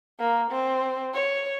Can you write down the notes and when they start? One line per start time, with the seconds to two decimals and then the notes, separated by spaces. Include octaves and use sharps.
0.20 A#3
0.51 C4
1.14 C#5